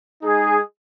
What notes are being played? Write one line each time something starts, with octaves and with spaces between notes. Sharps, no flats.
G#3 D#4 G#4